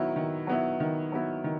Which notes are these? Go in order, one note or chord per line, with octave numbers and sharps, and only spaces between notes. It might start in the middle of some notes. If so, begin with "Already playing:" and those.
Already playing: D#3 F#3 B3 E4
D#3
F#3 B3 E4
D#3
F#3 B3 E4
D#3